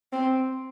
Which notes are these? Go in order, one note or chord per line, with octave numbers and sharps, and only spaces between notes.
C4